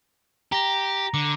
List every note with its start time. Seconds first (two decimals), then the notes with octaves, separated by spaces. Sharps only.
0.52 G4 A#5 A#6
1.14 D3 D6